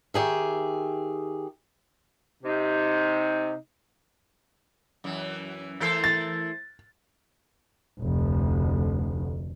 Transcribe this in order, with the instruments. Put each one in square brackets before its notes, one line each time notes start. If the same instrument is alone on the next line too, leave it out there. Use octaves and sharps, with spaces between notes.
[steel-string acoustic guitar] D#3 G4 G#4 E5
[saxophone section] C3 D#4
[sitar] F#2 E3
[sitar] E3 A4 A#4 [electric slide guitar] A3 E4 C5
[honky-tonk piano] A6
[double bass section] F1 D2